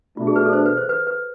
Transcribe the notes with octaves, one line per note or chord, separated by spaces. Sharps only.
B2 A3 D4 F4
G#4
B4
A4
C5
B4
C5
B4
B4